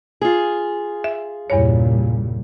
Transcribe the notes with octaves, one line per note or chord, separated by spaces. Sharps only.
F4 G#4
E5
E2 G2 A#2 C#3 G3 C#5